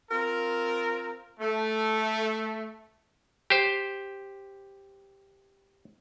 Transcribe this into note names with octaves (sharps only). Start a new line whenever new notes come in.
C4 F4 A#4
A3
G4 C5